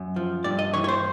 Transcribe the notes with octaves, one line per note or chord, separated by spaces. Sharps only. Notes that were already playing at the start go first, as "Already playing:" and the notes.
Already playing: F#2
F3
G2 D5
D#5
E3 C#5
C#5
C5